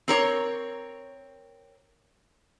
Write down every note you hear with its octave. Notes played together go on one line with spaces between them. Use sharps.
C4 A#4 C#5